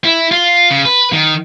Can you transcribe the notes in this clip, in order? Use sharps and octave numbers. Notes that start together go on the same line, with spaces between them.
E4
F4
C#3
B4
D#3